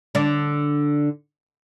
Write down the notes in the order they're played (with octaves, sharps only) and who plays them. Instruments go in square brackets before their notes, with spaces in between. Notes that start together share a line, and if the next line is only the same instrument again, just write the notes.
[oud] D3 D4